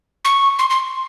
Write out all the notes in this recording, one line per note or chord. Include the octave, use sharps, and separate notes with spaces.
C#6
C6
C6